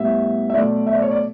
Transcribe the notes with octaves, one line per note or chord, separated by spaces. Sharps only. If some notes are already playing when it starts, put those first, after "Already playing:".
Already playing: A2 G3 B3 E5
E5
B2 F#3 A3 D5
E5
D5
C#5
D5